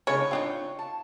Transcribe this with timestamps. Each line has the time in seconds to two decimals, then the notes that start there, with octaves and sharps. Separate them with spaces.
0.07 A2 C#3 G#3 B3 D4 C#5
0.31 C4 D4 D#4 F4
0.79 A5